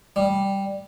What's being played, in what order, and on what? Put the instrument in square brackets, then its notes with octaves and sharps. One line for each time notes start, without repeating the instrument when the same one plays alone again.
[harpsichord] G3